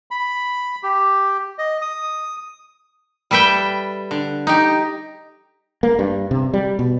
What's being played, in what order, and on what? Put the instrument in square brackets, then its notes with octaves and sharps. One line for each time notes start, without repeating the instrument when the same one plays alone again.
[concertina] B5
G4
D#5
D#6
[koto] G3 A4 B4 E5 G5
D3
D#4 G4
[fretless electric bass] A#3
G2
C3
G3
B2